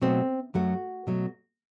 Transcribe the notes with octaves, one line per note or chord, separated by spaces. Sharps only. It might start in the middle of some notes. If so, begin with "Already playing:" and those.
B2 F#3 A3 C4
F#2 F#3 A3 F#4
B2 F#3 A3